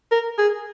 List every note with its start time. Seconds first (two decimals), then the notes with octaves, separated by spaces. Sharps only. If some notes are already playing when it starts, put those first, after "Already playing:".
0.11 A#4
0.38 G#4